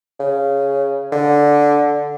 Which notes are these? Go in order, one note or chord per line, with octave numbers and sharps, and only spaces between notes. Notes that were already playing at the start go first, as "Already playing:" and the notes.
C#3
D3